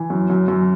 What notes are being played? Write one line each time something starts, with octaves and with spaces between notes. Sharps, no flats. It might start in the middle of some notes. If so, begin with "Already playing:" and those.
Already playing: E3
F#2
F#2
F#2